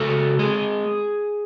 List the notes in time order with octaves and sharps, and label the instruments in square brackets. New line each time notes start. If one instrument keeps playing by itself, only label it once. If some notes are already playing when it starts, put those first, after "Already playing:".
Already playing: [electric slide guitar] C#3 F#4 A4
G#3 C4 G#4